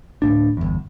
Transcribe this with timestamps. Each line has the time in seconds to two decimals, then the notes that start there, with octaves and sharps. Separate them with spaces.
0.22 D1 A2 D4
0.57 G1 E2